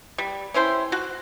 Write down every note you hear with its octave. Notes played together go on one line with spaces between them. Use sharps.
G3
C#4 E4 C5 G5
F#4